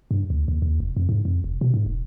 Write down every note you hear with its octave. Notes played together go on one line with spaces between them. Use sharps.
G2
D2
D#2
D#2
F1
F2
G#2
F2
F1
B2
G#2
E1